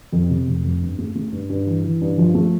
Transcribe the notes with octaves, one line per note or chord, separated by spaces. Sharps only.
F2
C3
F1
F2
G2
A3
A3
G2
G2
E3
E3
G2
F3
A3